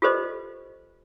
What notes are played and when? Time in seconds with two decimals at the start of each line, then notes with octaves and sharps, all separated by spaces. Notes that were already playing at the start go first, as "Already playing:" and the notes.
0.02 F4 G4 A4 B4 C5 D#5